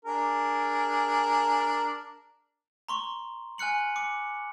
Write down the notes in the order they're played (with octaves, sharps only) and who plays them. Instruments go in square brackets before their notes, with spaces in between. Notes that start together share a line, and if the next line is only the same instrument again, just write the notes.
[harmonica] D4 G#4 A#4
[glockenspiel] A#5 C6 C#6
G#5 F6 F#6 C#7 F#7
D6 C#7